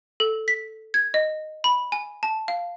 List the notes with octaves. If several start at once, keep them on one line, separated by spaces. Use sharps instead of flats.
A4
B6
G#6
D#5
B5
G#5
A5
F5